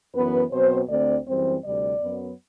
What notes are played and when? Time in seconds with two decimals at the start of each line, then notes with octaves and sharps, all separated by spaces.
0.14 F#2 E3 B3 B4
0.51 B2 F#3 C4 C5
0.89 D2 D3 A3 C4 D5
1.26 F#2 E3 G3 C4 C5
1.64 D2 C3 G3 D5
2.02 F#2 F#3 B3